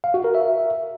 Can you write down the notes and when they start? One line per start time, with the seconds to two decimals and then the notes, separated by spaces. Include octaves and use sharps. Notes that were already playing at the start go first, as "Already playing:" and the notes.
0.04 F5
0.14 F#4
0.24 A#4
0.35 E5